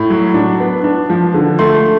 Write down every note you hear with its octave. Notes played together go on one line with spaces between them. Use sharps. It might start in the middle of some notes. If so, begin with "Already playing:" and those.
Already playing: A2
F#3
D4
B3
D4
F3
D3
A3 C6